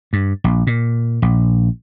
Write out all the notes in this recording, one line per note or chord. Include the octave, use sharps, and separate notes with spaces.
G2
A#1
A#2
A#1